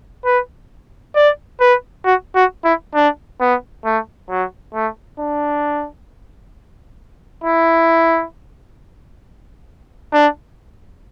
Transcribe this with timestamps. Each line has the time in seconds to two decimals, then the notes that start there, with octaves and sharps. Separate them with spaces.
0.25 B4
1.15 D5
1.60 B4
2.05 F#4
2.35 F#4
2.64 E4
2.94 D4
3.40 B3
3.85 A3
4.30 F#3
4.74 A3
5.19 D4
7.44 E4
10.13 D4